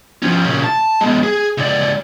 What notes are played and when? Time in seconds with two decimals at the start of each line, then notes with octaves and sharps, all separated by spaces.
0.23 F3 C#4
0.44 A#2 C#3
0.64 A5
1.01 G#3 B3
1.23 G#4
1.58 C#2 D5